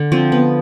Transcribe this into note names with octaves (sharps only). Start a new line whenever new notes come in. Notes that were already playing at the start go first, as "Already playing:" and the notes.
Already playing: D3
F3 C4
B3